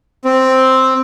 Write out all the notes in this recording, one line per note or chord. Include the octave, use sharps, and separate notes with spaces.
C4